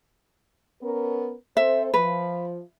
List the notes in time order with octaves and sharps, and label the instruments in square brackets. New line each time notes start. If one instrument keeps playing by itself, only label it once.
[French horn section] B3 C#4 A#4
[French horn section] C4 A4 C5 [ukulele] E5
[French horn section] F3 [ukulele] B4